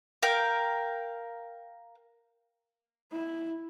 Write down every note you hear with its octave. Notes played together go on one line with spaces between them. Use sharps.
A#4 F5 G5
E4